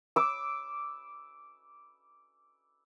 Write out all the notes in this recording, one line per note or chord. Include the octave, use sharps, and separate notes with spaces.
D6 E6